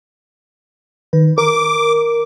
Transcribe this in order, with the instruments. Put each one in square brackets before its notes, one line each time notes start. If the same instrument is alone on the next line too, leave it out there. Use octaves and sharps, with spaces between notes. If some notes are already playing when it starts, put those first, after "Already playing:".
[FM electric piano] D#3 B4
[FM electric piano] A#4 [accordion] D6